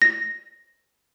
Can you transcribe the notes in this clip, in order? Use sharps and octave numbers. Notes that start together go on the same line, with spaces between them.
A#6